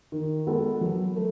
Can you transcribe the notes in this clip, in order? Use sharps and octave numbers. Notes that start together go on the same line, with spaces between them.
D#3
G#3 B3 F#4 A4
F#3
A3